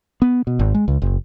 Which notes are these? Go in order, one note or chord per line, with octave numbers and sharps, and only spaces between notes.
B3
B2
G#1
G#3
C#2
F#1